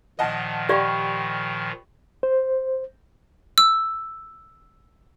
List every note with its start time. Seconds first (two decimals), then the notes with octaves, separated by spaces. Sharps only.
0.19 A#2 D#3 F3 D#5 F#5 A5
0.69 G4 D5 F5 G5 B5 C#6
2.23 C5
3.58 E6